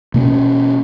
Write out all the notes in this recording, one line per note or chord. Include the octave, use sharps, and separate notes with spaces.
B2 A#3 B3 C#4